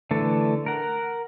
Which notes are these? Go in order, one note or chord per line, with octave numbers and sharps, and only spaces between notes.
D3 E3 A3 A4
A#4 F#5